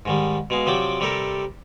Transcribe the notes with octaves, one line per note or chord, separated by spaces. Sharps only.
G#2 D#3 G3
B2 G#3 F5
C3 F3 F#3 D5 G5 D6
C3 G3 G4 A4 A#4